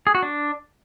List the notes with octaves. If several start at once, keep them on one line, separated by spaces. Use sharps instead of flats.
G#4
F#4
D4